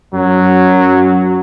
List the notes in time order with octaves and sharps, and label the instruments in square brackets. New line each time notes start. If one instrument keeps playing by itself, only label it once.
[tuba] F#2 [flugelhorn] F#3